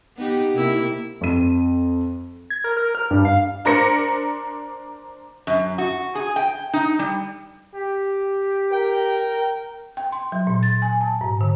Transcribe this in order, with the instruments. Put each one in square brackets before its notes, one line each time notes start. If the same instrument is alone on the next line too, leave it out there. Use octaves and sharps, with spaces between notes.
[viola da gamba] B3 D#4 G4
C3 A#3 E4
[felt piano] F2 D#7
[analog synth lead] G#6
A#4
A#4
F6
G2
F5
[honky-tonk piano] D4 A#4 C5 A#6 C#7
[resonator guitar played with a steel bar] F#2
F#4
G#4
G5
D#4
G3
[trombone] G4
[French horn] A#4 [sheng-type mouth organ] G5
[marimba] G5
C6
F#3
A#2
A6
G#5
A5
G#2
D3